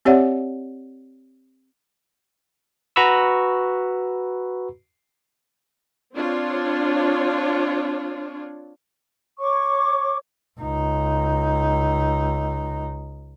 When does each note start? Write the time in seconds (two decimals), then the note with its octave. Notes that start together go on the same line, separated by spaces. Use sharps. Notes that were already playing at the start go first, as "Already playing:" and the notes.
0.05 C4 G4 C#5 D5 E5 F#5
2.96 F#4 B4 A#5 B5 C#6 E6
6.13 C4 D4 F4 C#5
9.39 C#5 C#6 D6
10.60 C#2 D#4